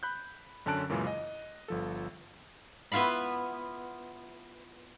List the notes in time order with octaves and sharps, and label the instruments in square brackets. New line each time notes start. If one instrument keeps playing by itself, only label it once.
[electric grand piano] B5 F#6 G6
F#2 D3 C#4 A5 F#6 D7
F#2 A#2 C#3 E3 G#3
D#5
G1 F3 A4
[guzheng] B3 E4 F4 F5 B5